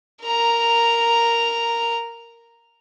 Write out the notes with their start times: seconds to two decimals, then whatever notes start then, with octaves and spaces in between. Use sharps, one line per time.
0.24 A#4 A#5